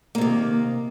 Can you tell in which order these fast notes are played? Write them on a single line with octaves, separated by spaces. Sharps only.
A#3 C3 D#3